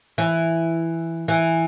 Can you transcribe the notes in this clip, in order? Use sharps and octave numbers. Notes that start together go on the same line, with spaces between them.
E3
E3